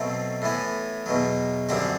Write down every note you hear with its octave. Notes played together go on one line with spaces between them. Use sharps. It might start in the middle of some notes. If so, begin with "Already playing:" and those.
Already playing: B2 F#3 A3 C4
A2 E3 B3
E2 B2 F#3
F#2 D3 G3 C4 F#4